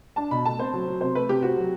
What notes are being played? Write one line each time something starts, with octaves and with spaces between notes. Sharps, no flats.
D4 A5
B2 B5
A3 A5
C4 C5
F#3
F#3
C3 C5
A3 B4
C3 G4
C4 F#4
F#3